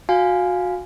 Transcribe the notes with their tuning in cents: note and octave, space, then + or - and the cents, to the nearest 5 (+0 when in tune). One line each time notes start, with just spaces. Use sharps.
F#4 -25 F5 +0 G#5 +0